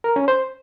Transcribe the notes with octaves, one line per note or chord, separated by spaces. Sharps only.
A#4
C#4
C5